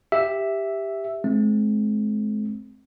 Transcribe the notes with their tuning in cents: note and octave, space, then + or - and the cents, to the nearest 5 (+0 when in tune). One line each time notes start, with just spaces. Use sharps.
G4 +5 E5 +0
G#3 +40 C4 +5